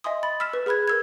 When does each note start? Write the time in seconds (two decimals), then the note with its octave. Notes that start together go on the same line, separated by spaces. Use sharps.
0.04 D#5 E5 G#5 C6 D#6
0.23 B5 A6
0.40 E6 F6 B6 E7
0.53 B4
0.66 G#4 B4 B5 F#6 G#6
0.88 A#4 E6 G#6